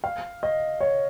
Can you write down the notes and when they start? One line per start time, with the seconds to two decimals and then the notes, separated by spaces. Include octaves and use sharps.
0.04 F5
0.43 D#5
0.81 C#5